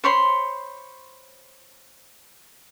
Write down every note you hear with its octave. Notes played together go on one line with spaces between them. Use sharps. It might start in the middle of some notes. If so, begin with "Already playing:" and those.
C5 C#5 B5 C6